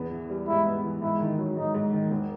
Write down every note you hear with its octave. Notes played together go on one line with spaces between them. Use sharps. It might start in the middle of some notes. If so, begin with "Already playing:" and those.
Already playing: E2 B3
E3
G3
G#2 E4
B3
E3
G#2 E4
D#3
F#3
G#2 D#4
G#2
D#3
E1